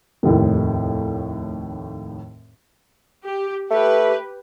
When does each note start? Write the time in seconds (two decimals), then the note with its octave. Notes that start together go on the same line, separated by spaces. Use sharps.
0.23 F1 D#2 A2
3.25 G4
3.71 A3 G4 B4